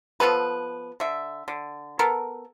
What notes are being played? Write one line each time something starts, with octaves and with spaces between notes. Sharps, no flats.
F3 B3 A4 B4
D3 E5
D3
B3 A4 A#4